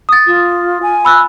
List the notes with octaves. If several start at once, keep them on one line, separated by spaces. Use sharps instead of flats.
D#6 A6
F4
G#5
B5 E6 F#6